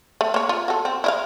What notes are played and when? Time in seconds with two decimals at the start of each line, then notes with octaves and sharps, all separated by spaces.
0.21 A3
0.34 A#3 C#5
0.49 F4
0.68 F#4 A4
0.85 C4
1.04 E4 D#5 F5